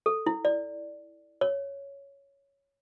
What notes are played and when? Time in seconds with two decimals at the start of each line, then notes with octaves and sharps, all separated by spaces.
0.06 A4
0.26 E4
0.45 D5
1.41 C#5